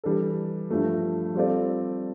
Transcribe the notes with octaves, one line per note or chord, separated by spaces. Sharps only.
E3 G3 D4 A4
G2 F3 A3
G3 C4 F4 A4 D5